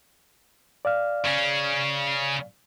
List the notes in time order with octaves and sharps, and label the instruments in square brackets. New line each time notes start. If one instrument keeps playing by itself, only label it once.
[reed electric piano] D5 F5 F6
[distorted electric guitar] C#3 C#4